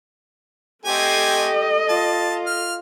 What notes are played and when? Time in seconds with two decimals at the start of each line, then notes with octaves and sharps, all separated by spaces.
0.85 A3 C4 G4 A4 D#5 G#5
1.89 F4 A5
2.47 F6